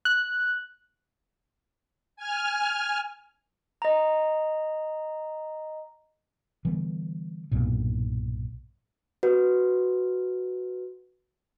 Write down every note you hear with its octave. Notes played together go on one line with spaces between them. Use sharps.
F#6
G#5 F6
D#5 A#5
D3 E3 G3 B3
B1 G2 A#2
F#4 B4